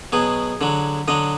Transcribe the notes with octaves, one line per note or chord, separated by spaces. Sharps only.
B2 F#3 G#4
D3 F#3
D3 F#3 D#5